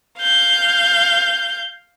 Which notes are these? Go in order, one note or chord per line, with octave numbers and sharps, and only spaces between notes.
F5 G6